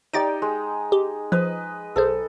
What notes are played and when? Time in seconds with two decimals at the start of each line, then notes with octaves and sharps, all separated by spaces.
0.13 D#4 G4 D5 D#5 A6 D7
0.42 G#3
0.92 G4
1.32 F3 B4 D#5
1.96 B1 G#4 A4 C5